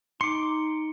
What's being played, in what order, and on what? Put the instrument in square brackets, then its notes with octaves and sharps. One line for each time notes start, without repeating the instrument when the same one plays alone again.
[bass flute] D#4 [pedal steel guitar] C6 D6 [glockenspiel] C#7